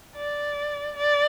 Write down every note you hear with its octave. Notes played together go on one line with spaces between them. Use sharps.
D5
D5